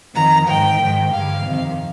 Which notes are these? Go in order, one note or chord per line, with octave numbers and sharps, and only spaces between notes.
F2 D#3 A#5
G#2 D#3 G5
G#2 D#3
G2 D3 F5
F2 C3 D#3